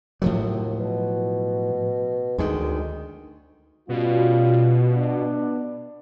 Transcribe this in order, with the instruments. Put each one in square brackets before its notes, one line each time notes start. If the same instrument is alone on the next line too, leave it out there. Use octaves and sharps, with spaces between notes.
[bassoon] D#2 [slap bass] A2 F3 F#3
[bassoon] B2
[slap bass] D2 D#3 [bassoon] G#3
[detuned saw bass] B2 [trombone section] G3 C#4 F4
[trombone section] B3 D4